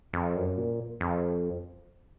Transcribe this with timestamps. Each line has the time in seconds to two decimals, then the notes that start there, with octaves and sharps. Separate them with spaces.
0.13 F2
0.36 F#2
0.57 A#2
1.00 F2